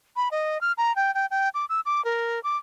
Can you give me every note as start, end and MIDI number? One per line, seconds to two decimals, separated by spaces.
0.16 0.29 83
0.31 0.61 75
0.61 0.72 89
0.78 0.95 82
0.96 1.13 79
1.14 1.26 79
1.31 1.49 79
1.54 1.65 86
1.69 1.80 88
1.85 2.04 86
2.05 2.42 70
2.43 2.57 86